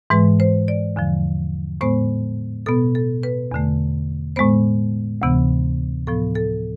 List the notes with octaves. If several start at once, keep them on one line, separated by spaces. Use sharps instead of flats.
G#2 E3 G#3 B4
C5
D5
E2 D3 F3
A2 G#3 B3 C5
B2 B3 A4
A4
B4
E2 D3 A3
A2 G#3 B3 C5
D2 C3 E3 B3
A2 F3 B3 A4
A4